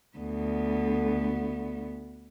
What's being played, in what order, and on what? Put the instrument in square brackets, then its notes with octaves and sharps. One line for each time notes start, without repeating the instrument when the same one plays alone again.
[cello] D2 B3